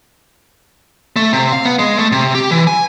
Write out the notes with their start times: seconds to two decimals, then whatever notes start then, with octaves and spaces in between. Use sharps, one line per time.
1.16 A3
1.33 C3
1.53 F5
1.65 B3
1.79 G#3
1.99 A3
2.12 C3
2.35 G4
2.51 E3
2.67 G#5